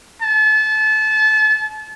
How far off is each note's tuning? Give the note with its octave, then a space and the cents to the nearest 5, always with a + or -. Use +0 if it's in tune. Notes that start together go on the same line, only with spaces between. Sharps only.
A5 -30